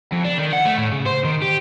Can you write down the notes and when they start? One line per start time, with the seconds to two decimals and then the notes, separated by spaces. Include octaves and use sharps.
0.12 F2
0.25 D4
0.38 D#3
0.53 F#5
0.65 A3
0.77 A2
0.92 C#3
1.06 C5
1.25 D#3
1.42 G4